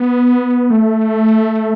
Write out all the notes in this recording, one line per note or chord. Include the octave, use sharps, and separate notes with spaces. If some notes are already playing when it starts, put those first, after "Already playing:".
Already playing: B3
A3